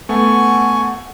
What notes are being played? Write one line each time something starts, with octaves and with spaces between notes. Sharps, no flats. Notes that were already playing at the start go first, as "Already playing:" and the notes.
A3 B3 F#5 G#5 C#6